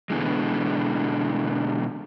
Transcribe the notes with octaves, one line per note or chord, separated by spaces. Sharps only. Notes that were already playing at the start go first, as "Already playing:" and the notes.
B2 D3 E3 G#3